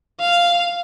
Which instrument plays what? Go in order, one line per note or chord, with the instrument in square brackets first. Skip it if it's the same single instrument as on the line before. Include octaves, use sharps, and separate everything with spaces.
[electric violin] F5